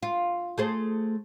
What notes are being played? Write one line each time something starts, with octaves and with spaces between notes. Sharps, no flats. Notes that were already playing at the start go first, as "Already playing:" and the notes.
F4
A3 G#4 C5